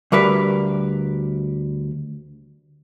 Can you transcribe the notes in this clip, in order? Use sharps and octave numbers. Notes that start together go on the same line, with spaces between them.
D2 G3 A#4 B4